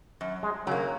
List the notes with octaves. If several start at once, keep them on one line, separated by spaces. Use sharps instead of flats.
F#2
G#3
C#3 F#3 A#3